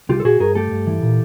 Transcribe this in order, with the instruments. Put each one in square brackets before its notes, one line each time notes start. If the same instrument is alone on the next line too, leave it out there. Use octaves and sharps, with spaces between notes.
[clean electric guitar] C2 F4 G4
A4
A#2 F#4 G#4
G2 G#4 A#4
A3 G4 A4
G2
E3
A#2